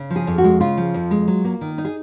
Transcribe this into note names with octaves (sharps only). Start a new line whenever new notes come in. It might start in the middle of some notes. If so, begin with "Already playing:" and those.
Already playing: C#3
F3
G#4
F2
F#4
G#3
C#3 F4
F3
F2
G#3
F#3
A#3
D#3
D#4
G#4